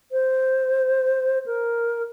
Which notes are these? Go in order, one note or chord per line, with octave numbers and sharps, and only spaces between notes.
C5
A#4